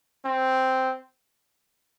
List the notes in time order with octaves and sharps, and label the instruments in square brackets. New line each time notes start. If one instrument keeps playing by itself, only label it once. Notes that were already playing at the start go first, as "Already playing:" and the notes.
[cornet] C4